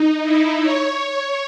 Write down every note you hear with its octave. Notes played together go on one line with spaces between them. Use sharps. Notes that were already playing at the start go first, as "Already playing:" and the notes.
Already playing: D#4
E4
C#5
C#5